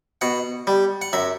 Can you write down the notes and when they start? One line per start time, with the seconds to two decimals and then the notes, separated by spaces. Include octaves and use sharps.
0.21 B2 F#5
0.67 G3
1.02 F#5
1.13 F#2 E5